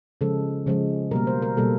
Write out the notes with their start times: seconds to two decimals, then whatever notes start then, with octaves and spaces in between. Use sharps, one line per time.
0.21 C#3 F3 G#3 A4
0.67 C#3 F3 G#3
1.11 B2 G3 A#3 A#4
1.27 C5
1.42 A#4
1.57 B2 G3 A#3 A4